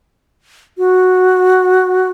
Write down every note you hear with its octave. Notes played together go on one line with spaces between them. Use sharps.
F#4